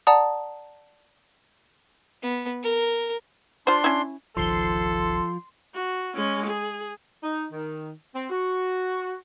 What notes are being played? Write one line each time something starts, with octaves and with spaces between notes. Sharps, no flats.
D5 F#5 A5 A#5 D#6
B3
A#4
D4 F4 C5 C6
C#4 E4
G1 C#2 D#3 F3 A4 C6
F#4
G#3 C#4
G#4
D#4
D#3
C4
F#4